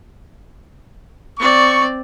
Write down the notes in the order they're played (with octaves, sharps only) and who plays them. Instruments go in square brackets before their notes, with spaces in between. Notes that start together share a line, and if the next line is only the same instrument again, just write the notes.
[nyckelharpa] C4 D5 [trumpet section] C#6